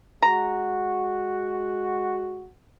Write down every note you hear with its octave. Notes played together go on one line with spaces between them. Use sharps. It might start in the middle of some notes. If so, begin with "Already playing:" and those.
G#3 F#4 A#5